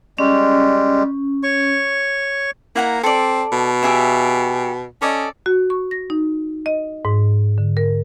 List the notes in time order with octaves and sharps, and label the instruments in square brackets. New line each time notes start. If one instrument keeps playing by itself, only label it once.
[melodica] G3 G#3 [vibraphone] C#4
[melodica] C#5 C#6
[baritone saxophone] A#3 [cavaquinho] E4 F#5 A#5
[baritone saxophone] C4 [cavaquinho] A4 D5
[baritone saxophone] B2
[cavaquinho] G4 G#4 E5
[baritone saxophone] C#4 [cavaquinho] A4 D5 D#5
[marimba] F#4
C#6
A#6
D#4
D#5
G#2
D3
A#4